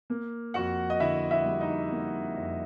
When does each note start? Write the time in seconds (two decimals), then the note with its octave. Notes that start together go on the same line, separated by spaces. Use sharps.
0.10 A#3
0.54 F2 F#4 F#5
0.90 D#5
1.00 D3 E4 E5
1.31 E4 E5
1.45 G3
1.61 D#4 D#5
1.92 A#3
2.37 F2